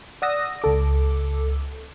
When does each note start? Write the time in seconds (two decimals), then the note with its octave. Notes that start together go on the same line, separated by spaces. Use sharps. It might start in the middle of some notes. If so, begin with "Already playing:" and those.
0.22 D5 F#5 D#6 E6 A#6
0.62 C#2 A4 D6